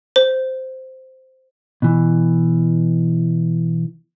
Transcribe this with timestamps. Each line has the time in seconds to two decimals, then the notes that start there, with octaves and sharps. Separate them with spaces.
0.16 C5
1.82 B2 E3